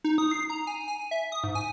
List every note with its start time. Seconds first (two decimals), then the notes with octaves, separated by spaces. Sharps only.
0.04 D#4
0.18 D#6
0.31 C7
0.50 A#5
0.67 G#5
0.88 G#5
1.00 G#5
1.11 E5
1.32 D#6
1.44 G#2
1.55 G#5